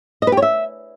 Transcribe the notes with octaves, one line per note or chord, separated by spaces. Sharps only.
D#5
B4
G4
C#5
E5